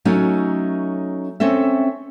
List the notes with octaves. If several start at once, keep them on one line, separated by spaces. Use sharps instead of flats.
F#3 A3 C#4 D#4
C4 C#4 A4 E5